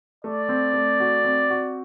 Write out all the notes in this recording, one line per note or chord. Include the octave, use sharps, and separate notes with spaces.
A3 D5
C4
A3
F#4
C4
F#4